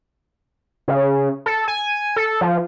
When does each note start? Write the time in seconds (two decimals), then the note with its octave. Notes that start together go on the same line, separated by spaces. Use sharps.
0.88 C#3
1.46 A4
1.68 G#5
2.16 A4
2.41 F3